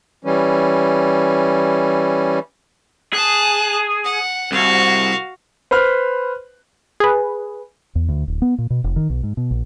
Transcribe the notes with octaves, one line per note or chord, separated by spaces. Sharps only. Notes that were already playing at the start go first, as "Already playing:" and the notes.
E3 G3 C#4
G#4 A5 F#6
F#5
C2 F#4 F5
B4 C5 B5 F6
G#4 B4
E2
D2
D1
B3
A#2
B2
F1
D#3
B1
G#2
B2
A#1